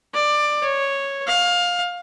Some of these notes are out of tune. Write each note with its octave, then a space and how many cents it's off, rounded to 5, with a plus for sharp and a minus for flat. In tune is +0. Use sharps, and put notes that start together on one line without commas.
D5 +15
C#5 -5
F5 +20